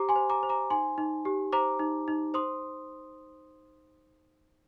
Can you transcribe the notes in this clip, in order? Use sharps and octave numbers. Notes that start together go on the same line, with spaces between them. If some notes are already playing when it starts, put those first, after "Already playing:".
Already playing: G4 C5 A#5 D6
G#5 C6
C5
A#5 D6
C5
A#5 D6
D#4 G#5 C6
D#4
G4
C5 A#5 D6
D#4
D#4
C5 C6 D#6